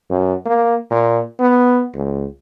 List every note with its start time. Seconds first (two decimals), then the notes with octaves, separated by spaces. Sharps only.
0.10 F#2
0.46 A#3
0.91 A#2
1.40 B3
1.94 C#2